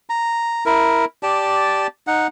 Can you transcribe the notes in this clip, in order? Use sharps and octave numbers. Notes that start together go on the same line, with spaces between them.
A#5
E4 A#4
G4 D5 A5
D#4 F#5